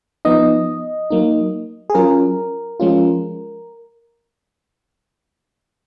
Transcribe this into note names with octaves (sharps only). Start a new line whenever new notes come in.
F3 B3 D#4 D#5
F#3 A#3 D#4
G#4
F#3 C#4 F4 A#4
F3 G#3 C#4 F4